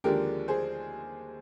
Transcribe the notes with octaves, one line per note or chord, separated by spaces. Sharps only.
D#2 D3 F3 G#3 D4 G4 A#4
G#4 C5